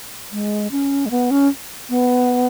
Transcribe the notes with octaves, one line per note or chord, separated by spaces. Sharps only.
G#3
C#4
G#3
B3
C#4
B3